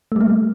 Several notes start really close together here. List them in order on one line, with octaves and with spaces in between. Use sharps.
A3 G3 A#3